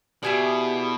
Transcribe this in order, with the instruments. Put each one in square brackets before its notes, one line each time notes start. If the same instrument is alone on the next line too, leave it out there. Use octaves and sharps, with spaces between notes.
[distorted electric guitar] B2 [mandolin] E4 G#4 D5 [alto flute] G4